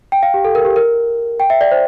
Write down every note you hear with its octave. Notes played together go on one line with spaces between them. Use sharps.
G5
F5
G4
A4
A#4
G4
A#4
G5
E5
D5
C5